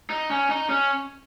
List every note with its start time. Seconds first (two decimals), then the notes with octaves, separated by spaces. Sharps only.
0.10 D#4
0.31 C#4
0.50 D#4
0.70 C#4